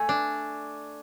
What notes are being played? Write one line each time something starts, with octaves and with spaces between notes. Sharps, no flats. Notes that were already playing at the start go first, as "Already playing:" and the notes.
Already playing: A3 G#5
D4